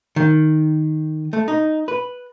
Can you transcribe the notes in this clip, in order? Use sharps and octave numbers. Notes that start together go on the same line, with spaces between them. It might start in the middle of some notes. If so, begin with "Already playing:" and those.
D#3
A3
D#4
B4